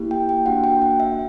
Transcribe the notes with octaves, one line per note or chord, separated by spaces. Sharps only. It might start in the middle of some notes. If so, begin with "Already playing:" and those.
Already playing: A#3 E4 G4
G5
G5
A#3 D4 F#4 F#5
G5
F#5
E5